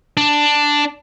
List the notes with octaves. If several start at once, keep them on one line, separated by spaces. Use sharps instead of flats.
D4